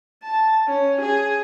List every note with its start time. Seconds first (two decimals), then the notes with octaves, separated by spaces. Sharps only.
0.23 A5
0.68 C#4
1.01 G#4